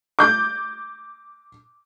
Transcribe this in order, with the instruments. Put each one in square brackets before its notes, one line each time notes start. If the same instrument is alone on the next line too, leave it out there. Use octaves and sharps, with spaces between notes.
[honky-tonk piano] D6 G6